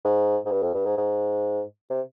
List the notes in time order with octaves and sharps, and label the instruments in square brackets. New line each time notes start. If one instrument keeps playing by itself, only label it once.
[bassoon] G#2
G#2
G2
F2
G2
G#2
G#2
C3